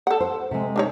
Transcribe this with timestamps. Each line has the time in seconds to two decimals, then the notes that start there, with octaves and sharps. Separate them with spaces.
0.07 A4 F#5
0.20 C5
0.51 C3 G#3
0.76 D4 D#4 C#5